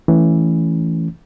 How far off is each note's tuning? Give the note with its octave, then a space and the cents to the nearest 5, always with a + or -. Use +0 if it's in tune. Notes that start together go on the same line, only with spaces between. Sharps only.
E3 +0 A3 +0 C#4 +0